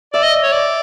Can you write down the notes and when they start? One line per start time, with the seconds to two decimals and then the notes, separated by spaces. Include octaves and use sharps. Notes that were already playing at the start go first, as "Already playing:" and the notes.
0.13 D5 E5
0.23 D#5
0.43 C#5
0.52 D5